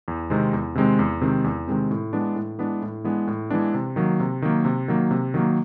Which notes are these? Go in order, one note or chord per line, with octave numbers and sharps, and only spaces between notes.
E2
C3 D#3 G#3 C4
E2
C3 D#3 G#3 C4
E2
C3 D#3 G#3 C4
E2
C3 D#3 G#3 C4
A2
E3 G#3 B3 D4
A2
E3 G#3 B3 D4
A2
E3 G#3 B3 D4
A2
E3 G#3 B3 D4
C3
D#3 F#3 A#3
C3
D#3 F#3 A#3
C3
D#3 F#3 A#3
C3
D#3 F#3 A#3